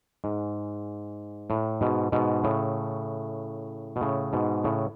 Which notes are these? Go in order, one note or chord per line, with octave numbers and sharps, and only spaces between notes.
G#2
A2
G#2 B2
G#2 B2
A2 C#3
B2
A2 C#3
G#2 B2
A2 C#3